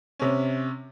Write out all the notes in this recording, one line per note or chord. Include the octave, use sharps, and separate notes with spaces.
C3 C#4